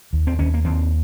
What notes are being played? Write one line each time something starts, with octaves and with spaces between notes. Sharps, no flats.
D#2
C4
D#2 C#4
A#3
D#2 C4